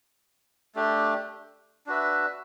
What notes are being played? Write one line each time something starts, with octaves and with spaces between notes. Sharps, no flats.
A3 D4 G4
D4 F#4 B4 E5